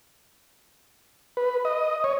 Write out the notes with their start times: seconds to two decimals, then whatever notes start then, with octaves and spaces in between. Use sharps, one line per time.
1.37 B4
1.65 D#5
2.04 C#5